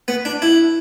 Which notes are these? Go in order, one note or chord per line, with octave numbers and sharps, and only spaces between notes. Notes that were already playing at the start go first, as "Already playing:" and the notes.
B3
D4
E4